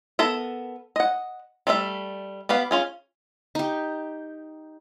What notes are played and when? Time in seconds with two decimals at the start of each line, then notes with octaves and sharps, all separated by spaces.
0.19 B3 A4 A#4 E5
0.96 D#5 F#5
1.67 G3 A3 D4 A4 E5
2.49 B3 G4 B4 F5
2.71 C#4 F4 G#4
3.55 D#4 G4